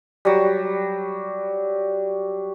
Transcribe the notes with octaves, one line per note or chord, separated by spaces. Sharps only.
F#3 G3